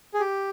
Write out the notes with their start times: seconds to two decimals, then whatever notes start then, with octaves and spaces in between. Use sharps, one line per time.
0.14 G#4
0.20 G4